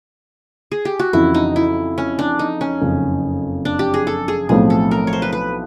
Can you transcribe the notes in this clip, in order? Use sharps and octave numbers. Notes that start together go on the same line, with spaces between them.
G#4
G4
F#4
F2 C#3 E3 E4
D#4
E4
C#4
D4
D#4
C#4
F#1 F2 C#3
D4
G4
G#4
A4
G#4
B1 A2 F3 A3 C4 G#4
A4
A#4
C#5
C5
B4
B4